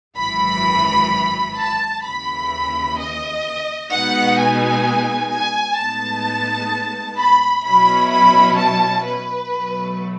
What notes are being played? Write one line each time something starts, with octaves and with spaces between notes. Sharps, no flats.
G#1 F#2 E3 B5
A5
D#2 C#3 E3 B5
D#5
B2 G#3 B3 D#4 F#5
G#5
G#5
A2 G#3 B3 D#4 A5
B5
B2 F#3 C#4 E4 B5
B5
A5
B4
B2 F#3 A3